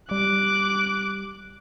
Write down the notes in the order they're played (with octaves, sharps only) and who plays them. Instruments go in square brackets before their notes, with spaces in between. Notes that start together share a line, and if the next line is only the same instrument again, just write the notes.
[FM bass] G3 [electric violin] D6 F#6